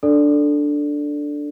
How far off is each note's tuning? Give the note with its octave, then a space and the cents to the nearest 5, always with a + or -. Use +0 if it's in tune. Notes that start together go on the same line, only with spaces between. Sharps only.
D4 +0 A4 +5 D5 +0